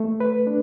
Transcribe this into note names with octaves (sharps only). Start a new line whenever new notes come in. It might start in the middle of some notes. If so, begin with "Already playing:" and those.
Already playing: A3
B4
D4